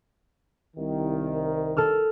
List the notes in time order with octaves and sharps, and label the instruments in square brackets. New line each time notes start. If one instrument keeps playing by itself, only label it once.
[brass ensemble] C2 D#3
[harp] A4 E6 F6